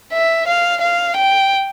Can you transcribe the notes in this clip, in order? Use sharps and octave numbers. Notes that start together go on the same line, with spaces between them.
E5
F5
F5
G5